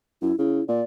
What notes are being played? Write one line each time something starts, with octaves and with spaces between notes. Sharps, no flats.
F#2 E4
C#3 E4
A#2 D5